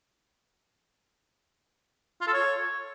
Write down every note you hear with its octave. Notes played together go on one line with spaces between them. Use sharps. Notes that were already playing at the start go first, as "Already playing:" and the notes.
F4
A4
C#5